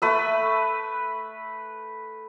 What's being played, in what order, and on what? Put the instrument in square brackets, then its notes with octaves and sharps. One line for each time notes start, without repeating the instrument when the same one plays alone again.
[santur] A3 B4 E6